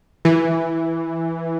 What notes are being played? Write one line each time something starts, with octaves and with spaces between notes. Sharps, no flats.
E3